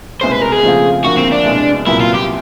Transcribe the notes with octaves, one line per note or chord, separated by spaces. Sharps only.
C2 B2 G#3 C#4 C5
B4
A#4
G#4
C#3 F3 A3 C4 F4
D2 D3 F3 A#3 F#4
C4
D4
C2 B2 G#3
C2 A#2 F#3 B3 E4
F4
G4